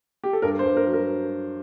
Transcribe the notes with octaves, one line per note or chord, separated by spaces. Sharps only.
G4
A4
G2 A#4
C5
G2
A#4
F#3
A#4